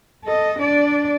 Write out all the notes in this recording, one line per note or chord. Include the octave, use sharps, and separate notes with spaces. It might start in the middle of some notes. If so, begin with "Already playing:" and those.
A4 D#5
D4 D5